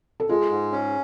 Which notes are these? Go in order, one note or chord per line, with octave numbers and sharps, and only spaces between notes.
A4
G#3 F4 G#4
G#2
C#4